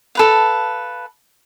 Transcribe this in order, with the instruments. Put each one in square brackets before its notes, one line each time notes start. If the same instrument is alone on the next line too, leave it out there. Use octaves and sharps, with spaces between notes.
[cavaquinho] A4 B4 F5